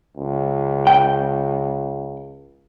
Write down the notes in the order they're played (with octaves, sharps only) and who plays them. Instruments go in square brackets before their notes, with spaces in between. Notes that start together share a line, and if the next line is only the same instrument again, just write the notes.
[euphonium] C#2
[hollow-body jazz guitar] G5